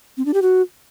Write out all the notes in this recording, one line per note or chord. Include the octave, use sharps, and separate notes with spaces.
C4
D4
G4
F#4